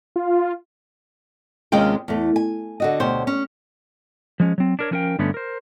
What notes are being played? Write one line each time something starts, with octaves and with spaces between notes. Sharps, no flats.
F4
D#2 C3 G#3 C#4 F4 G5
E2 A3
G#5
D3 F#4 D#5
D2 B2 G4 C5 C#5
C#4
F3 G#3 C#4
F#3 C4
D4 A#4 C#5
F3 A3 C#4 A#4 F5 G5
G2 D3 A3 B3 C#4
A#4 C5